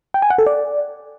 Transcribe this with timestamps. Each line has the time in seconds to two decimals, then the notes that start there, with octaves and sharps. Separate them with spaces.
0.14 G5
0.22 G#5
0.30 F#5
0.38 A4
0.46 D5